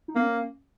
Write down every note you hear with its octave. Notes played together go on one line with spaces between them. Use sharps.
D#4
A#3 B3
C#4